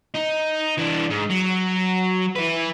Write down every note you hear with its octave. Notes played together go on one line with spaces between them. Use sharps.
D#4
E3 D4
G#2
F#3
E4 B4